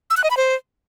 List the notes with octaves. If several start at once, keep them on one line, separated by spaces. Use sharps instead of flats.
E6
F#6
D#5
B5
C5